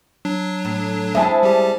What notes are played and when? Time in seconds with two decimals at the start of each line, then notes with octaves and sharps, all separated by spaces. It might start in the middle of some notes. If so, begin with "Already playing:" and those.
0.25 F#3 D4
0.65 A2
1.15 G#3 C4 E4 E5 G#5 A5
1.43 G3 G4